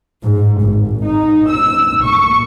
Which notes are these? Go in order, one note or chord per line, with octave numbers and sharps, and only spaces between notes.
G#2
G#1
D#4
E6
C#6